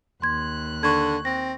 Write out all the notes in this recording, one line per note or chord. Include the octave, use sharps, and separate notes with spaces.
D#2 C6 F#6 G#6
D3 C#6 G#6
C4 A#6